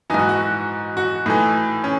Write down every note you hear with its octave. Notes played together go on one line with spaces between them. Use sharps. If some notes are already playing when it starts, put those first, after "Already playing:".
G#2 E3 D#4 F#4
F#4
F#4
A2 E3 D#4
C#4